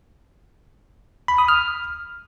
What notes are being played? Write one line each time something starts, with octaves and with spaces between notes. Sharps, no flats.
B5
D#6
F6